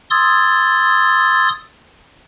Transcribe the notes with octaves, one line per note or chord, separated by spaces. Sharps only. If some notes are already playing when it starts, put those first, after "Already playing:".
C6 D#6 E6 G#6 A6